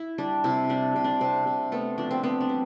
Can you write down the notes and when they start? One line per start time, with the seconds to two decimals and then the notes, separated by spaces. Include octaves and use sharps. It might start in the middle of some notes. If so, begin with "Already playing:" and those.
Already playing: E4
0.18 G3 D4
0.44 C3 E4
0.69 G3 D4
0.96 C3
1.04 D4
1.21 C3 C4
1.47 C3
1.72 A3 B3
1.98 F3 D4
2.11 C4
2.23 B3 C4
2.40 D4
2.49 G3